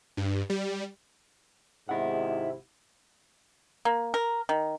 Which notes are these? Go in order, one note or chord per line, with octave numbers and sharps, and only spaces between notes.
G2
G3
G#1 G#2 C3 E4 F#5
A#3
A#4
D#3